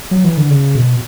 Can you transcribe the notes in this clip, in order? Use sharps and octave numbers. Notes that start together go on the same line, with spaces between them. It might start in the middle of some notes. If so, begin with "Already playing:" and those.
F#3
E3
D3
C#3
B2